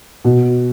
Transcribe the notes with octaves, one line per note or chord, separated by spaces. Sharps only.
B2